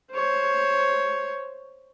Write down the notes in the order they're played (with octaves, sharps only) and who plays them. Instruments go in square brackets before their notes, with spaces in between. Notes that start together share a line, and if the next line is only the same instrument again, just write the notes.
[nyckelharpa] C5 C#5